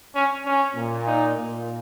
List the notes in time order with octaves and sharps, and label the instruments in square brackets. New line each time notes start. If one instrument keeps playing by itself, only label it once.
[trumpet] C#4
C#4
[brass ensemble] A#2
[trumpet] D#4
[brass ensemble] A#2